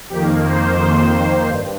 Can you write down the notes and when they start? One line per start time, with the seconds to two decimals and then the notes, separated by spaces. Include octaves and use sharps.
0.10 F2 D#3 A#3 G4
0.45 C5
0.79 F2 D#3 A#3 C5
1.48 G2